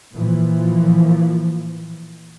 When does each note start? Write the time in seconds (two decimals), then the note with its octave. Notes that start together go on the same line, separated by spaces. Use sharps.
0.13 A#2 E3 F3